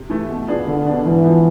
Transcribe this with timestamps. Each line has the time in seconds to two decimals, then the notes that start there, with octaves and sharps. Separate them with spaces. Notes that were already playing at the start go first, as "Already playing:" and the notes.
Already playing: C3
0.10 E3 A3
0.29 B2
0.47 B3 D4 F4 G#4
0.67 C2 D3
0.86 B2 B3 D4
1.05 G#2 E3
1.24 F3 B3